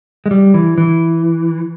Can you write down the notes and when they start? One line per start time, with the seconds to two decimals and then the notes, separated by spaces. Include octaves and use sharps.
0.26 G#3
0.31 G3
0.54 E3
0.78 E3